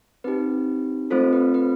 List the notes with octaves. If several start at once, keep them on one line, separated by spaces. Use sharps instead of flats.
C4 D#4 G4 B4
A3 C4 F4 A4 C5
B4
B4